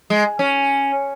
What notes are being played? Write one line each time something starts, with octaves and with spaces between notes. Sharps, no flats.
G#3
C#4